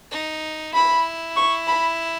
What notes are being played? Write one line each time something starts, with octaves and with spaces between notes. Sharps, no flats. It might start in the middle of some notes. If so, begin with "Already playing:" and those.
D#4
E4 B5
C#6
B5